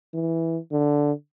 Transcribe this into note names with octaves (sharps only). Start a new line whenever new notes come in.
E3
D3